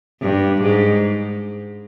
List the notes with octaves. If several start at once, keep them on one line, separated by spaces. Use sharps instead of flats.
G2
G#2